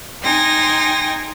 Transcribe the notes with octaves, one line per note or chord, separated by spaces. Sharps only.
D#4 G5 G#5 C6 A#6